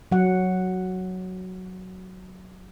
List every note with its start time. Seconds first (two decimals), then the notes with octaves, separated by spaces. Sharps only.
0.12 F#3 F#5